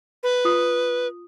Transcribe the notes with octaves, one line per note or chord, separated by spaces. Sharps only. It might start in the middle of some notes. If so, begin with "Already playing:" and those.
B4
F4 D#6